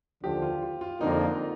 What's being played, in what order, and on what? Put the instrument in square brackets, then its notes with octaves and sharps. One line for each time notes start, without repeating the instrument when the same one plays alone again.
[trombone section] D#2 D3 F3 [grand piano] G4
[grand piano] F4
F4
F4
[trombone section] F2 D3 F3 A#3 [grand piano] D#4